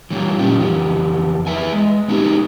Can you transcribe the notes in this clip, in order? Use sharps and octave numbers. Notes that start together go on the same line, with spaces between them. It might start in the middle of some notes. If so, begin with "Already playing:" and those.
E3 G3 F4
A#2 F#3 C#4 F4 G4
F2 E3 G4
G#4 A4 B4 E5 G#5
G#3
G#3 B3 D#4 E4 G4 G#4